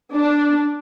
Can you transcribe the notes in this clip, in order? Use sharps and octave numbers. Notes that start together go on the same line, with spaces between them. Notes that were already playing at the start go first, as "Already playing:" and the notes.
D4